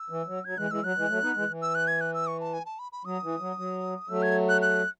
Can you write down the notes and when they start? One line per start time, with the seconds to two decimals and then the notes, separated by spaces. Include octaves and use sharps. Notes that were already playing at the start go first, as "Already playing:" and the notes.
Already playing: E6
0.10 E3
0.27 F#3
0.45 F#3 G#6
0.58 E3 G#3 F#6
0.70 E3 G#3 E6
0.83 F#3 F#6
0.97 E3 G#3
1.09 F#3 A3
1.22 B3 D#4
1.36 E3 G#3
1.48 E3
1.62 E6
1.75 F#6
1.88 G#6
2.01 F#6
2.14 E6
2.27 C#6
2.40 A5
2.53 G#5
2.66 A5
2.79 B5
2.92 B5
3.05 F#3 D#6
3.23 E3
3.40 F#3
3.58 F#3
4.09 F#3 A3 E6
4.22 G#6
4.49 F#6
4.62 F#6